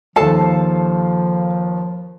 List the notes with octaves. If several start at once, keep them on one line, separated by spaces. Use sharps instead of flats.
D#2 F3 A4 A5 C7